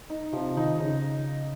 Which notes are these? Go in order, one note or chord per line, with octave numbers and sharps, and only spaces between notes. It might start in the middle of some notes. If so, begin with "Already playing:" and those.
D#4
C3 F3
D#3 D#4
C#3 D#4